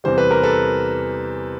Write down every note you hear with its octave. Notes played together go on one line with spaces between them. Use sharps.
E2 C3 E3 G3 C5
B4
A#4
A4 B4